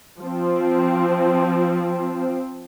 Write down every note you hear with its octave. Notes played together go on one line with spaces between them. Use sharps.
F3 C4